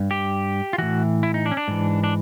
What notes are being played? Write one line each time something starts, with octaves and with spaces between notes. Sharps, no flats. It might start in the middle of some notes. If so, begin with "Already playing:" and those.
Already playing: G2
G4
F4
A2 E3 F#4
E4
D#4
D4
C#4
D4
G#2 E3
D4